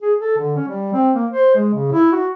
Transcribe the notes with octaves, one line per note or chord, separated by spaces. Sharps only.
G#4
A4
D3
C#4
G3
C4
A#3
C5
G#3
C#3
E4
F#4